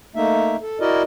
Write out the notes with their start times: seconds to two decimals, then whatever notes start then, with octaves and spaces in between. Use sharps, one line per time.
0.16 A3 A#3 D#4 E5
0.61 A4
0.80 E4 F#4 A#4 D5 D#5